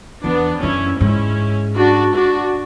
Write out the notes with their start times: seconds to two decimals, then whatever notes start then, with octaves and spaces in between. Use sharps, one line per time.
0.24 E2 B3 D4
0.62 F#2 C#4 E4
1.00 G#2 C#4 E4
1.77 D4 F#4
2.15 D4 F#4